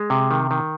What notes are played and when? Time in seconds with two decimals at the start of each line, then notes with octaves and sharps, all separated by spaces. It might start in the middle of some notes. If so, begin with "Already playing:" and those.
Already playing: G#3
0.10 C3
0.31 D#3
0.51 D#3